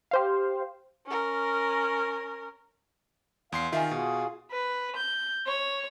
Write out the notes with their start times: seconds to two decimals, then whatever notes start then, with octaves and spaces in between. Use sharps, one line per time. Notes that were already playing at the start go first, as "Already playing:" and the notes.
0.11 G4 C5 F5
1.07 C#4 A#4
3.52 E2 F5 C6 C7
3.72 C3 D#3 F4 E5 G#5
3.91 B2 F4 F#4 G#4
4.51 B4
4.96 G6
5.47 C#5